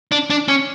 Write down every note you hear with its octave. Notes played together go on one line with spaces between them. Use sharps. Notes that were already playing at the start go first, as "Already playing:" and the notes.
D4
D4
C#4